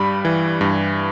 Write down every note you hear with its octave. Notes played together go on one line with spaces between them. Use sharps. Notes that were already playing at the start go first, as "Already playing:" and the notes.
Already playing: G2 G3 B5
E3
G2